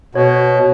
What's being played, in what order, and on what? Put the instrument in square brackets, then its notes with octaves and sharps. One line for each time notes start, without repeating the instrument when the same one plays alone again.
[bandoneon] B2 [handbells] C#5